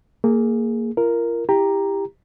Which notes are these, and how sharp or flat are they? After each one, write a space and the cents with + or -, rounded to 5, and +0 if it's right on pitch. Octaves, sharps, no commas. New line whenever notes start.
A#3 -15 G#4 +0
F4 -40 A#4 +0
E4 +0 G4 +15 A#5 +0